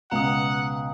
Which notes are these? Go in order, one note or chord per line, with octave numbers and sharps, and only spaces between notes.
C#2 B2 F#5 A#5 D#6